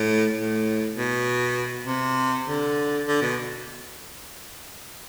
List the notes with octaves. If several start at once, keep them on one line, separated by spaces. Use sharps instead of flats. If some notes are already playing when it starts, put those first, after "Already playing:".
Already playing: A2
A2
B2
C3
D3
D3
B2